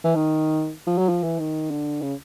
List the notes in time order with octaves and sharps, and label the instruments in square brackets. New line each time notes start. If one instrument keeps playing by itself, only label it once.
[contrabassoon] E3
D#3
F3
F#3
F3
E3
D#3
D3
C#3